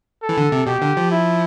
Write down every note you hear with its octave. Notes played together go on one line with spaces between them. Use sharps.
A4
E3
D3
C3
B2 G4
D3
F3
E4